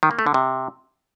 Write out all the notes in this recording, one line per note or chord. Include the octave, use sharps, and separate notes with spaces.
D#3
A#3
A3
D3
C3